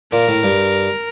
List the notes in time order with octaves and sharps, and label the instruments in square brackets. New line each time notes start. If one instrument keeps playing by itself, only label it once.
[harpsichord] A#2 [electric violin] A#4
[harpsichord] A2
G2